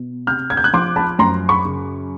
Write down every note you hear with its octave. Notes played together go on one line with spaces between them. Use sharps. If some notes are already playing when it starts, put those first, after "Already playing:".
Already playing: B2
C3 F6 G6
G#6
G6
F#6 G#6
F3 C6 D6
A5 B5
F#2 A#5 C6
B5 C#6
C#3